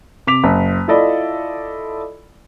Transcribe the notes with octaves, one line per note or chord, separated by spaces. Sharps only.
C3 D6 B6 F7
F#1
E4 F4 A4 D5 D#5 B5